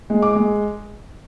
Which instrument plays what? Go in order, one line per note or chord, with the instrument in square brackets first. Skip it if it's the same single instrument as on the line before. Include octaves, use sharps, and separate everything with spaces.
[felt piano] G#3
D6
G#3